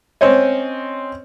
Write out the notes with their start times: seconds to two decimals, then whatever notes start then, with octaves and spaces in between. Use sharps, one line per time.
0.21 C4 C#4 C5 C#5 D#5